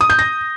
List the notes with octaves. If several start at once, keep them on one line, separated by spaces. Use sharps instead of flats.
D#6
G6
A#6